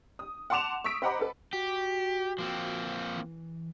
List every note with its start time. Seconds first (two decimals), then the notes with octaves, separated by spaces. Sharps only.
0.19 D#6
0.50 F#5 A5 C6 D6 E7 F7
0.84 C#6 D#6 E6 B6 D7
1.02 C5 D#5 F#5 A#5 B5 D6
1.19 A4 B4
1.53 F#4 G4
2.38 F3 A#3 C4
3.16 E3